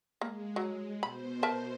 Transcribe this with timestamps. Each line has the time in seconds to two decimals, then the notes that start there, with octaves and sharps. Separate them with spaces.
0.21 G#3 A#3
0.56 F#3
1.03 B2 C5 B5
1.43 A#4 E5 A5